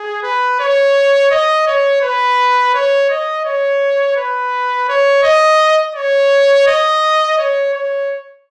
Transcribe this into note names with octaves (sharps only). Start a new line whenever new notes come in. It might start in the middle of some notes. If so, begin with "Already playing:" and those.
Already playing: G#4
B4
C#5
D#5
C#5
B4
C#5
D#5
C#5
B4
C#5
D#5
C#5
D#5
C#5
C#5